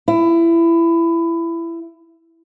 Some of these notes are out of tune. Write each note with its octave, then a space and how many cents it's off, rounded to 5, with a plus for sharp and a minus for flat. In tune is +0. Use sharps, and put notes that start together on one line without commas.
E4 +20